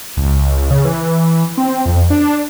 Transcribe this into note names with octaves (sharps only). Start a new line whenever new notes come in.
C#2
C#3
E3
C4
F2
D4